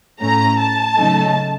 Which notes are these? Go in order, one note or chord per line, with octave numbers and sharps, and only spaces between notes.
A2 A3 C#4 A#5
A5
C#3 F#3 A3 D#4